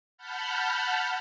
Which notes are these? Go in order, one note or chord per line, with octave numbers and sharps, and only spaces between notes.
F#5 A5 B5 F6 G6